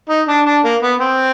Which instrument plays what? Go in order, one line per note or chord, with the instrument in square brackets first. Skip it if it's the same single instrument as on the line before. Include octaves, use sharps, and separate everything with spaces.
[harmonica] D#4
D4
D4
A#3
B3
C4